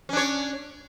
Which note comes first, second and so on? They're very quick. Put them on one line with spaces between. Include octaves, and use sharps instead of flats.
C#4 D4 C#5